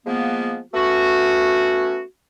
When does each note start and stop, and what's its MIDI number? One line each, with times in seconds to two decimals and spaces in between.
0.07 0.59 53
0.07 0.59 56
0.07 0.59 58
0.07 0.59 59
0.74 2.02 57
0.74 2.02 59
0.74 2.02 61
0.74 2.02 66